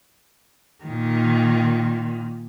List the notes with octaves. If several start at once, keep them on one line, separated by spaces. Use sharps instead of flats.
A#2 D#3